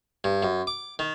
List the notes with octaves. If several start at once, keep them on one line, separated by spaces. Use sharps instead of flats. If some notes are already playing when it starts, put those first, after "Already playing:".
G2
F#2
D6
D#3